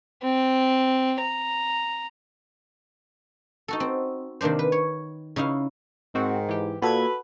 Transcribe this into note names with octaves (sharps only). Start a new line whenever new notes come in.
C4
A#5
D#4 F#4 A4
C4
C3 D#3 A#3 D4 C5
B4
C#5
C#3 D#4 E4 F5
G#2 D#3 C4 F#4
E3 G4
A#2 F#4 A4 B4 B5 G#6